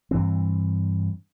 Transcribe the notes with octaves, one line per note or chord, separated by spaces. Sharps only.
G2 E3 C4